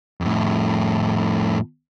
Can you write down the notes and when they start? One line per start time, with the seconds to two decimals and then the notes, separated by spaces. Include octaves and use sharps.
0.21 F2 A2